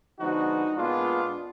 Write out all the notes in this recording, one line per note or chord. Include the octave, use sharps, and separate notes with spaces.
D3 F3 G#3 B3 D#4 F#4
A#2 G#3 B3 D4 F4